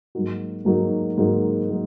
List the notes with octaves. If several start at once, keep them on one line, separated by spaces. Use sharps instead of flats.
G#2 F#3 A#3 D#4 F#4
G#2 F#3 A#3 D#4 F#4
G#2 F#3 A#3 D#4 F#4
F#3 A#3 D#4 F#4